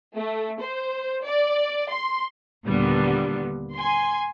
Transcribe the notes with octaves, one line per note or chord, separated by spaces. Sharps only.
A3
C5
D5
C6
D#2 A#2 D3 G3 B3
G#5 C6